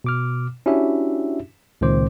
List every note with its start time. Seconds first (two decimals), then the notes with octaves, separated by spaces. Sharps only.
0.04 B2 D6 F6
0.66 C#4 D4 E4 F#4 G4 E5
1.81 C#2 A#2 D#3 C4 C5 D6